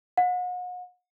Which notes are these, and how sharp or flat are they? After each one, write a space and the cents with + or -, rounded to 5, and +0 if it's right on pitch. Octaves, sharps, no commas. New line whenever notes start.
F#5 -40